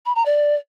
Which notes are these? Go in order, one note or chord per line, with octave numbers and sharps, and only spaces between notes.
B5
A#5
D5